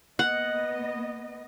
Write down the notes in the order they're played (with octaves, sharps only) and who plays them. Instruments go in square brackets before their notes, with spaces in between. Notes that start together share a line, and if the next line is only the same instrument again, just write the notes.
[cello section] A#3 B3 D#5 [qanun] F#5